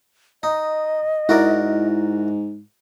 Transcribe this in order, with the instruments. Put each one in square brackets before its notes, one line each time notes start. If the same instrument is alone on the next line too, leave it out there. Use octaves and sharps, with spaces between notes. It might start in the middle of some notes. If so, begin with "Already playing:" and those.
[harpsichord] D#4 [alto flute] D#5
[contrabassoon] G#2 [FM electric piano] E4 [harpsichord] F#4 A#4 D5